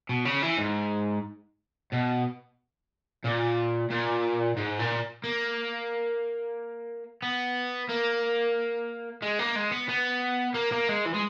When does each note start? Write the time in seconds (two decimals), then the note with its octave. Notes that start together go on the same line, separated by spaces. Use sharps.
0.09 B2
0.25 C#3
0.42 E3
0.58 G#2
1.92 B2
3.25 A#2
3.91 A#2
4.57 G#2
4.79 A#2
5.24 A#3
7.22 B3
7.89 A#3
9.22 G#3
9.39 A#3
9.56 G#3
9.71 B3
9.89 B3
10.54 A#3
10.72 A#3
10.89 G#3
11.05 E3
11.14 G#3